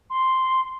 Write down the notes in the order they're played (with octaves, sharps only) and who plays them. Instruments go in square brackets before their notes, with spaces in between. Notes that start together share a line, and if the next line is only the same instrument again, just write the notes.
[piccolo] C6